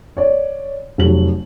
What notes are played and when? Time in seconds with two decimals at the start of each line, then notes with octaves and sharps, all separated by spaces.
0.17 C#5 D5
0.98 F1 F#3 F#7